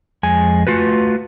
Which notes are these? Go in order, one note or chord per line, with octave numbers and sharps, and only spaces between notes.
F2 G#3 G#5
A3 F4 F#4 B4